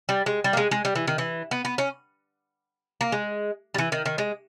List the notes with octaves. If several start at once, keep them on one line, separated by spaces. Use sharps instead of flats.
G3
G#3
G3
A#3
G#3
G#3
G3
E3
D#3
E3
B3
B3
C#4
A#3
G#3
G3
E3
D#3
D#3
G#3